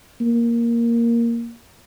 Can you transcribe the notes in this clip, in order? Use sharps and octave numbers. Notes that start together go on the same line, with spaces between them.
A#3